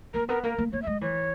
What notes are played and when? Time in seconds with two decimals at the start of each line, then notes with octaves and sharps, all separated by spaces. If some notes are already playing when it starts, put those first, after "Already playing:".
0.14 A#3 A#4
0.29 B3 A#4
0.43 A#3 A#4
0.58 A#3
0.72 A#3 C#5
0.82 E5
0.87 G#3 D#5
1.01 E3 C#5